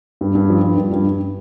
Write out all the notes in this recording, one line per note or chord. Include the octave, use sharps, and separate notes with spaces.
G2
G2
F3
G2
G2
G2
G2